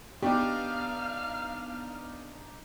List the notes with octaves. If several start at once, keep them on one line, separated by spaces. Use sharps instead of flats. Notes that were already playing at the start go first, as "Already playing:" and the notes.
B3 D4 D#4 G4 F5 F6